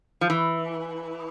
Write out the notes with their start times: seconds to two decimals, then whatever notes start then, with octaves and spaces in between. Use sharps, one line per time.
0.21 F3
0.30 E3